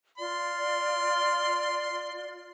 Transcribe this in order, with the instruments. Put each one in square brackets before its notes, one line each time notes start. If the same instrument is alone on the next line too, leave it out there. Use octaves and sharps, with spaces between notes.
[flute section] F4 D5 [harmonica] C6